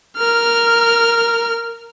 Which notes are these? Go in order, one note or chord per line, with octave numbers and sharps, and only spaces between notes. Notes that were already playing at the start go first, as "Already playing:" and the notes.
A#4 F6